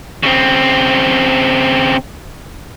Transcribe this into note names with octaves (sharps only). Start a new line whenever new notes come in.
C#3 C4